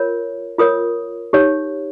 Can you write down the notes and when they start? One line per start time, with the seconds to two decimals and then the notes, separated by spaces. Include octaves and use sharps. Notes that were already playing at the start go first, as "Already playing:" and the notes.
Already playing: F4 A#4 C#5
0.58 F4 A#4 C#5 D#6
1.33 D#4 G4 C#5